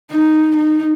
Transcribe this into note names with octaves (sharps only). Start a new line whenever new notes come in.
D#4
D#4